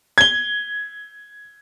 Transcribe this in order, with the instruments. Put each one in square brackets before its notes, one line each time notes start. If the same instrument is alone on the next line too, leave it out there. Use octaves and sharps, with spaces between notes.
[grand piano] G#6 G7